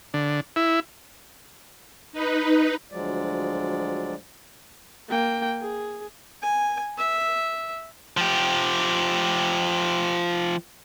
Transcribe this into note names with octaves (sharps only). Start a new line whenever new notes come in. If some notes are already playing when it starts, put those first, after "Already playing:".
D3
E4
D#4 B4
D2 F3 F#3 G#3 D5
A#3 G5
G#4
G#5
E5
F3 G4